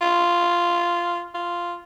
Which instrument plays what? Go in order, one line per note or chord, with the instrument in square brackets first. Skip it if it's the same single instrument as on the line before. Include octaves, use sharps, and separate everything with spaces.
[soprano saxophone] F4
F4